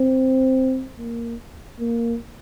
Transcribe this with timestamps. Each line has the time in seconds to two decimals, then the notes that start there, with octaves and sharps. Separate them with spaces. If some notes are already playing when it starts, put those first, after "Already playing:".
Already playing: C4
0.98 A#3
1.80 A#3